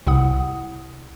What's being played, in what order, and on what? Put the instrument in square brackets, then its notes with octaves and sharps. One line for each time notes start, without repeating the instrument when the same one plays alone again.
[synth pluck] C2 C3 E4 F#5 D#6